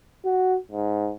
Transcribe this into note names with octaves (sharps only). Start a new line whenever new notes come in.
F#4
G#2